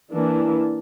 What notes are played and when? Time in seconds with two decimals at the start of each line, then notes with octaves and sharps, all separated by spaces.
0.10 E3 A#3 D4